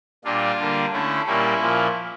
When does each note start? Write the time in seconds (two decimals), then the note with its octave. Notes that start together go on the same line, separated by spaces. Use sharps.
0.24 A#2 G3 A#3 D4 F4
0.59 D3 G3 A#3
0.93 D3 A3 C#4 E4
1.26 A#2 G3 A#3 C#4 E4
1.61 A#2 F3 A#3